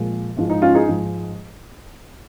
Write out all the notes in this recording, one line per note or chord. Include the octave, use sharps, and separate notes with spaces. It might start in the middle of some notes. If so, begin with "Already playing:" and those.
Already playing: A#2 F3 G#3
G#2 F3 G#3
D#4
C#4 F4
D#4 G#4
G#2 F3 G#3